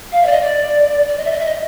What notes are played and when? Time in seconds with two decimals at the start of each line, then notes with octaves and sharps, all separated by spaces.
0.12 F5
0.22 E5
0.26 D5
0.32 D#5
0.41 D5
1.08 D5
1.17 D#5
1.25 E5
1.31 D#5
1.39 E5
1.46 D#5